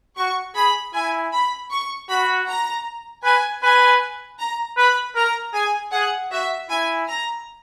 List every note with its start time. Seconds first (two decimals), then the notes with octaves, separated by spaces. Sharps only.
0.17 F#4 C#6
0.56 G#4 B5
0.94 E4 G#5
1.33 B5
1.71 C#6
2.09 F#4 B5
2.48 A#5
3.24 B4 G#5
3.63 B4 G#5
4.39 A#5
4.77 B4 B5
5.16 A#4 A#5
5.54 G#4 G#5
5.93 G#4 F#5
6.31 F#4 E5
6.69 E4 G#5
7.08 A#5